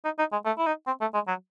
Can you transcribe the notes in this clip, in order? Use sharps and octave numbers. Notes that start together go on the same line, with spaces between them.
D#4
D#4
G#3
A3
E4
D#4
C4
A3
G#3
F#3